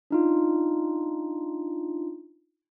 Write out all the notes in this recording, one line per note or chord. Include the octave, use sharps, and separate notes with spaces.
D4 D#4 F4